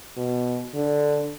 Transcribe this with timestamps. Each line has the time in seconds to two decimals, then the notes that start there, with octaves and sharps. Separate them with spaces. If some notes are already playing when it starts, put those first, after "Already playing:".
0.17 B2
0.74 D3